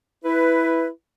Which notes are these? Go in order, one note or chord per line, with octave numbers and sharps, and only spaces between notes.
E4 B4